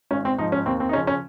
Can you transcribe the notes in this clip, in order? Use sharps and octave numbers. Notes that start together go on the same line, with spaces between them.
G#1 C#4
C4
G#2 F3 D#4
C#4
D#2 C4
C4
D#4
C#3 F3 C#4
C#4